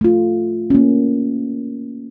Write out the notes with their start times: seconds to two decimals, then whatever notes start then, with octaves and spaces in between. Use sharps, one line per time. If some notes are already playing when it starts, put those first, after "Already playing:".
0.01 A3 F4
0.70 A#3 C#4